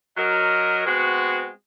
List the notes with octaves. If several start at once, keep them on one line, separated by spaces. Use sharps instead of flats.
F#3 A#4 D#5
G#3 B3 C4 F#4